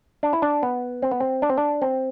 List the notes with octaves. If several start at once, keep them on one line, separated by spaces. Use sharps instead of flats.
D4
E4
D4
B3
C4
B3
C4
D4
C4
D4
C4